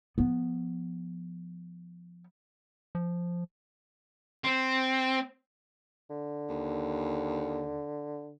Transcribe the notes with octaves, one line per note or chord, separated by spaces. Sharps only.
F3 B3
F3
C4
D3
D#2